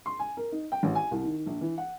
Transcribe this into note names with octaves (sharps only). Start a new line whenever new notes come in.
C6
G#5
A#4
D#4
G5
A1
G#5
C2
D#3
A#1
E3
F#5